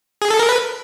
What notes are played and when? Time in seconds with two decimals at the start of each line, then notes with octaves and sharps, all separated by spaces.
0.22 G#4
0.30 A4
0.39 A#4
0.49 B4